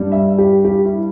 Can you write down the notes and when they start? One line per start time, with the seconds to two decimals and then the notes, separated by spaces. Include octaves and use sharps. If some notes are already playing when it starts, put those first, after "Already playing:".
Already playing: G2 G3
0.12 E5
0.38 G4
0.65 G4
0.85 E4